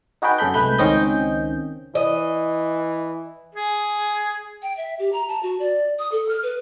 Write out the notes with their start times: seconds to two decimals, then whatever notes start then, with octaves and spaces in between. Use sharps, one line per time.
0.22 D#4 F#4 G#4 B4 G5
0.38 F#2 C#3 G#4 A4 B5 G6
0.54 C2 G#3 A3 B4 B5 G6
0.78 C#2 D#3 C4 C#4 D#5 G6
1.95 E3 D#5
3.55 G#4
4.62 G5
4.77 E5
4.99 G4
5.12 A#5
5.28 A5
5.43 F#4
5.60 D5
5.99 D#6
6.12 A4
6.29 F6
6.43 B4